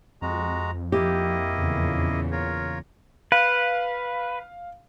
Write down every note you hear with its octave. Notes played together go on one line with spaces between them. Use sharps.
F2 G#3 F#4 A#5
F3 A#3 E4 G4 D#5
E2 A#2 C#3
F4 A#4 C#5
B4 F5